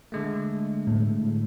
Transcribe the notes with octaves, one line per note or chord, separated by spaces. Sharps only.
D3 G#3 A3
A2